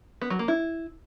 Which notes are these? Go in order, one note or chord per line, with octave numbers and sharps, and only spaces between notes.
B3
F#3
A#3
E4